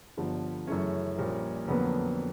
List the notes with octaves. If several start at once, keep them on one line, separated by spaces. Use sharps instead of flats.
G1 G2 D3 F3
F#2 C#3 E3 A3 C#4 C#5
A#1 A#2 G3 A#3
F2 D3 F#3 A#3 B3 B4